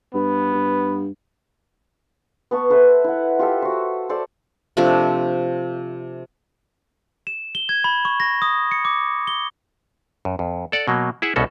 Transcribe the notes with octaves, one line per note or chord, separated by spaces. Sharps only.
G2 B3
G2
B3 A5 C#6
A4 B4 C5 E5
E4 F#5
F4 G4 A4 E5
F#4 C5
A4 C5 D5 A5
C3 F3 A3 D4
E7
G7
G#6
B5
C#6
A#6
D#6
C#7
D6
G7
F#2
F2
A4 D5 F#5
B2 F#3 A#3
E4 G#4 E5 F#5
C2 B2 C#4 F#4 A4